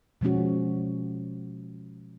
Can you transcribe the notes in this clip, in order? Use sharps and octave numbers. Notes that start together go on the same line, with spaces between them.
B2 F3 G#3 C#4 F#4